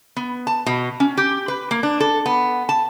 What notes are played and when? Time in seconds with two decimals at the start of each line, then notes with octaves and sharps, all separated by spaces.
0.16 B3
0.47 A5
0.66 B2
1.00 C#4
1.17 G4
1.48 B4
1.71 A#3
1.83 D4
2.00 A4
2.26 B3
2.69 A5